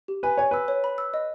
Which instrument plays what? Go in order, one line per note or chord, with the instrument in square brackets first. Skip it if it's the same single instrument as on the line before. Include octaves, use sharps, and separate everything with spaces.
[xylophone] G4
[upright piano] B4 [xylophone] G#5
[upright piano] C#5 [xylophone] G#5
[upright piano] B4 [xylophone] E6
[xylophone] C#5
B5
E6
D#5